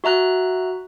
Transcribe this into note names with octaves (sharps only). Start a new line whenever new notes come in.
F#4 E5 A#5 F#6